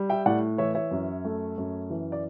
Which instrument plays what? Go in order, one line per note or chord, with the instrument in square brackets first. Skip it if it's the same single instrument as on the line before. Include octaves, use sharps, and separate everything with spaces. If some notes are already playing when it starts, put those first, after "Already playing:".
Already playing: [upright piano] G3
E5 G5
A2 D5 F#5
E3 C#5 E5
C#5 E5
F#2
A3
F#2
E3
D5